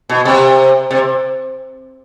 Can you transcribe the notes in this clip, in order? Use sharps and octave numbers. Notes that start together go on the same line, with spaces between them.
B2
C3
C3